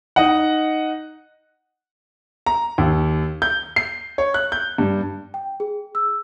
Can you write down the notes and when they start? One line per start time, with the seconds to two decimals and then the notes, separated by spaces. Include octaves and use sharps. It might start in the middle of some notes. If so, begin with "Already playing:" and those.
0.16 D#4 D#5 F#5
2.46 A#5
2.78 D#2
3.42 G6
3.76 C7
4.18 C#5
4.34 F#6
4.52 G6
4.78 G2
5.34 G5
5.60 G#4
5.95 E6